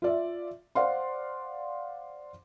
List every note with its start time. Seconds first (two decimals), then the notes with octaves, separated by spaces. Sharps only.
0.02 F4 D5 E5
0.75 C5 D5 F5 F#5 C6